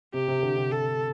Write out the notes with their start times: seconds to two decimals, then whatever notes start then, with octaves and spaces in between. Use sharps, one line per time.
0.14 C3 G4
0.28 C3
0.43 D3
0.57 C3
0.72 A4